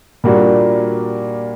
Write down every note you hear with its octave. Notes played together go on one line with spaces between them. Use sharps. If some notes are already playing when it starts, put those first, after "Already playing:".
A#2 G3 A#3 D4 F#4